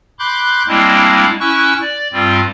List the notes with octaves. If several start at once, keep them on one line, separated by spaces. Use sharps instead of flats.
B5 C6 D6 F#6 G6
G3 G#3 A#3 C4 D4 E4
C#4 E4 C#6 E6 F#6
D5
G2 G3 C4 F4